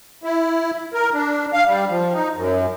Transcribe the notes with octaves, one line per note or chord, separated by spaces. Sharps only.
E4
A#4
D4
F5
G3
F3
D#4
F#2